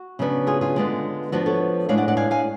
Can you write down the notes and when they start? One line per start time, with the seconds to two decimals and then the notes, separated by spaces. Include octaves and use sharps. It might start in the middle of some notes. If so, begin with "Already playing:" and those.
Already playing: F#4
0.19 C#3 F#3 B3 D4
0.47 F4 G#4
0.61 F4 G#4
0.76 D3 G#3 B3
1.32 F3 B3 D4 F#4
1.46 A4 C#5
1.89 A2 G#3 D4 C#5 F5
1.97 D5 F#5
2.08 D5 F#5
2.17 F5 G#5
2.31 F5 G#5